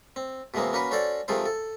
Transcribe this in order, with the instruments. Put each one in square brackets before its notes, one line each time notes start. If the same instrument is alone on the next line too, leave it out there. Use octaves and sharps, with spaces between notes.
[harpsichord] C4
B2 E3 G#3 A#3 C4
A#3 C#4 F#4 B4
C#4 F#4 A4 C5 D5 A5
C3 D#3 F3 G#3 A4 C5
A4